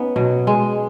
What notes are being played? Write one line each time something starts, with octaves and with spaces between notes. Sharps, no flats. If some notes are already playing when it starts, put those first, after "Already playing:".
Already playing: B3 C#4 D#4
B2 F#3
G#3